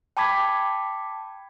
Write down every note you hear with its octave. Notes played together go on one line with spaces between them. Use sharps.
G5 A5 B5 D6 G#6 B6